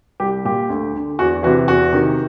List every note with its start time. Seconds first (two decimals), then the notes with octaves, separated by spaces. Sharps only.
0.20 C2 G4
0.45 A#2 G4
0.70 D2
0.95 D3
1.19 E2 F#4
1.43 C3 E3 F#4
1.68 E2 F#4
1.93 C3 D#3